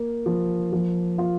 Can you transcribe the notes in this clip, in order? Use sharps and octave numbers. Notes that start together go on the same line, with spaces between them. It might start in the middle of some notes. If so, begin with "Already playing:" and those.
Already playing: A#3
F3
F3
F4